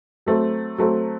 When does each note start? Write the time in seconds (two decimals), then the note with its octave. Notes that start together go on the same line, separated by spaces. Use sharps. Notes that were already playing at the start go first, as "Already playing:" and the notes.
0.26 F#3 A3 C4
0.78 F#3 A3 C4